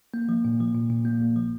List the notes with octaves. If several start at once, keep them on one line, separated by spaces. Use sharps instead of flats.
A#3
F3
A#2
F3
A#2
A#2
A#3
A#1
F3